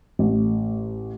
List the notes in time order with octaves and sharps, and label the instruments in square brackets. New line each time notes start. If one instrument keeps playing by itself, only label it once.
[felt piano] A1